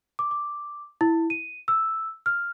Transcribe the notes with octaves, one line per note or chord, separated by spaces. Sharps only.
D6
D6
E4
D#7
E6
F6